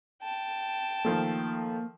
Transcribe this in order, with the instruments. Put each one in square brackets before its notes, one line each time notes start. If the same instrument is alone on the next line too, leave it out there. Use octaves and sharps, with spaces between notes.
[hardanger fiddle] G5 A5
[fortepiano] D#3 F3 A3 [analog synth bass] A#3